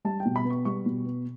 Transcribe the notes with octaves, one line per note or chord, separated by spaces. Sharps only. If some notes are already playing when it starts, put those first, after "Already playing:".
G3 A5
G5
B2
B5
B3
C#6
G3 C#6
B2
B3